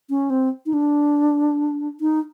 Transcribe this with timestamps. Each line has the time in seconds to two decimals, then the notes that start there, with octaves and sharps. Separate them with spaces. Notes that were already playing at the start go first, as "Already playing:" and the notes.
0.10 C#4
0.30 C4
0.66 D#4
0.73 D4
2.01 D#4